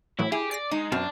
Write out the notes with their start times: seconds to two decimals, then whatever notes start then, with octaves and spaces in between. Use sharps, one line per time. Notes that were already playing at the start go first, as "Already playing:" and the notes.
0.19 A2 E3 F#3 E4
0.32 E4 G4 G#4
0.51 D5 A#6 C7
0.71 G#3 D#4
0.92 F#2 B2 C4 D5 A5